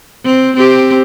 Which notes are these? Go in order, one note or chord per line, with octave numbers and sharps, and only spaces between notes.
C4
C4 G4